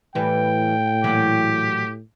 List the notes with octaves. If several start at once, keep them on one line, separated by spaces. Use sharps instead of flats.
A2 E3 G3 B4 G5
A#2 E3 F#3 G4